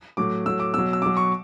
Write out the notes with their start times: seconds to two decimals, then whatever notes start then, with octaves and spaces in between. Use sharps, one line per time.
0.17 A2 F#3 D6
0.46 A2 F#3 E6
0.60 D6
0.74 B2 F#3 E6
0.93 E6
1.02 B2 F#3 D6
1.17 C#6